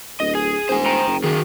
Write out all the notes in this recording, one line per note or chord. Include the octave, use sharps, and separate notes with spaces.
D1 D#5
G#4
E1 C5 G#5
G5 A#5
F#1
D#3 F#4 G#4